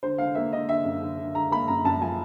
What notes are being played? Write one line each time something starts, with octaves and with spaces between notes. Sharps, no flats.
D3 C5
D3 F5
A#3 E5
D3 D#5
D3 E5
F#2
D3
D3
D3 A#5
A#3 B5
F#2 A#5
F#2 A5
F3 G#5